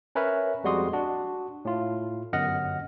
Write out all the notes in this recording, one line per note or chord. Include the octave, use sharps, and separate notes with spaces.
C#4 A#4 B4 C#5 E5
F2 G3 G#3 F#4 C6 D#6
D4 F#4
A2 F4
G1 F#2 D#5 F#5 F6 A#6